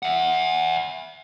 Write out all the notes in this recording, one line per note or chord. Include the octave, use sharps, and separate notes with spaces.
E5 F#5